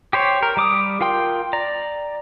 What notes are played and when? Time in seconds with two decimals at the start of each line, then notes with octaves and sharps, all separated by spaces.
0.13 G4 C5 C#5
0.43 A#4
0.57 G3 D6 D#6
1.01 F4 A#4 G5 C6
1.53 D5 A#5